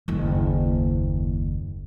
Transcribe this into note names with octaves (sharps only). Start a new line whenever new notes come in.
F#1 D#2